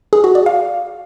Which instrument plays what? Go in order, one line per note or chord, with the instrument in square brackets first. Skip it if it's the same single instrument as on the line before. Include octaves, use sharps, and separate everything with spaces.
[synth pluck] G#4
F#4
D5
F5